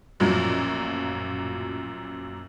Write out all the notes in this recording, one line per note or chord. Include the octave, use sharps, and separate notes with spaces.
A1 F#2 A#2 F3 F#3